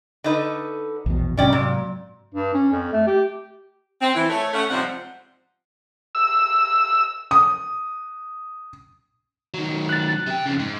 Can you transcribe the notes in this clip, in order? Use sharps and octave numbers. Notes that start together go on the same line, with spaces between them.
D3 D#4 B4
A#1 E2 B2
G#2 C3 F#3 C#4 D5 G5
A#2
G2
C#4
F2
A3
G4
C4
E3
A3 C#5
A3 C#4 F#5
G#2 C3 F3 G3 C4 F#5
E6
D#6
D#3 F#3
F#6 A6
C3 G5
F2 C#3
G#2